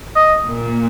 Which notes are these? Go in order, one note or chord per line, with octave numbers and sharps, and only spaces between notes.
D#5
A#2